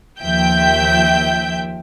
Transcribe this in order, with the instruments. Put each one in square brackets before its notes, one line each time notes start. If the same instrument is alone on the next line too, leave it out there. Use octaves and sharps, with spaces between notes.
[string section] D#2 F3 E5 G5 G6